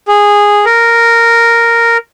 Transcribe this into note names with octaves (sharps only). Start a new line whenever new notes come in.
G#4
A#4